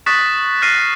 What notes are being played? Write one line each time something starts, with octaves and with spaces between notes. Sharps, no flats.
C#6 D#6 F#6 A6 B6
F6 F#6 A6 A#6 C7 D#7